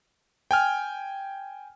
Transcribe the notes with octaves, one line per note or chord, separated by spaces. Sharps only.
G5 G#5 F6